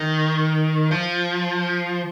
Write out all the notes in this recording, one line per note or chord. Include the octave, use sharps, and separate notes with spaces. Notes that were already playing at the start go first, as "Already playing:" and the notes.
Already playing: D#3
F3